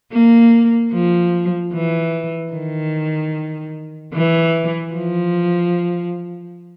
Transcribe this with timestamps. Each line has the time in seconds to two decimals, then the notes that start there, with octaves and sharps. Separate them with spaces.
0.13 A#3
0.93 F3
1.73 E3
2.53 D#3
4.14 E3
4.94 F3